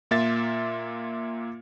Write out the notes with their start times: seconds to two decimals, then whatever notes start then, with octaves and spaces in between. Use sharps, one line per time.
0.11 A#2 A#3 F4 E5 A6